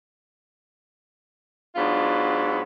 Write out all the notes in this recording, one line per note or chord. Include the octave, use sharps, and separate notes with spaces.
G#2 F#3 B3 D4 F4